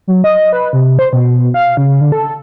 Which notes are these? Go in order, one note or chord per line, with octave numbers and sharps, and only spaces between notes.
F#3
D#5
B4
C3
C5
B2
F5
C#3
D3
A4